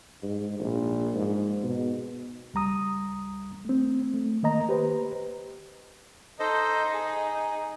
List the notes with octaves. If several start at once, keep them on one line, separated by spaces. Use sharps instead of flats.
G#2
A#1
G#2
B2
C#2 G3 A#5 D#6
A3 C4
A3
D#3 A#3 D#5 A#5
G4 B4 C5
D#4 A4 C5 D#5
G#4